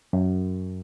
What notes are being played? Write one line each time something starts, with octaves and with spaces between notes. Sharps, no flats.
F#2